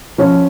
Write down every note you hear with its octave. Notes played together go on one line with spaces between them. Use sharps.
F3 C#4